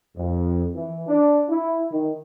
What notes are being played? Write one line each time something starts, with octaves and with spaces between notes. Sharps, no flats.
F2
E3
D4
E4
D#3